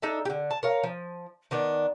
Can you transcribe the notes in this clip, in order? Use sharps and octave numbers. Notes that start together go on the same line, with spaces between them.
D4 D#4 A4 E5
D3 G4
A5
A#4 C#5 F5
F3
D#3 B3 D4